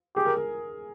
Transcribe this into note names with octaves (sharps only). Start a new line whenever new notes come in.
G4 G#4
A#4
A#4